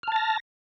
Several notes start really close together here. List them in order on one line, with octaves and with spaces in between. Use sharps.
F6 A5 A6 A#6